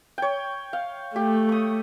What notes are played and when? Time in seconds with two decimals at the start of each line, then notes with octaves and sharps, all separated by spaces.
0.18 C#5 G5
0.73 F5
1.16 A3 G4
1.49 C#6 D#6